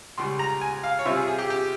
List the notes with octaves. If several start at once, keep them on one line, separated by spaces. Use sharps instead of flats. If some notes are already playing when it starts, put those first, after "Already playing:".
C#2 C#3 G3 C6
A#5
G#5
F5
C#5
C3 G3 C4 F4 E5
G#4
G#4
G4
G4